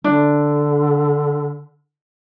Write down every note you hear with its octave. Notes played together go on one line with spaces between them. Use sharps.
D3 D4